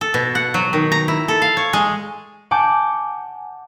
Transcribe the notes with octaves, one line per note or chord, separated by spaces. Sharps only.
A4
B2
F#5
F#3
D#3
A#5
E4
A4
F5
C#5
G#3
F#5 G#5 A5 D6 G6